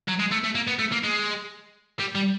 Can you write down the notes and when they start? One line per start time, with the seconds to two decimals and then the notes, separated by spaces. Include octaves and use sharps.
0.08 F#3
0.19 G#3
0.31 A3
0.44 A3
0.55 A#3
0.67 B3
0.79 A3
0.92 A#3
1.04 G#3
2.00 G3
2.15 G3